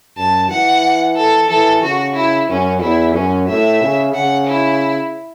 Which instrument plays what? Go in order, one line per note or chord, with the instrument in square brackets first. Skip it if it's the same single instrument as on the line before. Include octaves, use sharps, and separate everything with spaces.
[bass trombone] F#2 [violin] A5
[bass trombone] E3 [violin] F#5
[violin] A4
[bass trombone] E3 [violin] A4
[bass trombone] C#3 [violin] F#4
[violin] E4
[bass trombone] F#2 [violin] C#4
[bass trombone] E2 [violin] E4
[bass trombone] F#2 [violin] C#4
[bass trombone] A2 [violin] E5
[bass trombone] C#3
[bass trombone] C#3 [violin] F#5
[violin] E4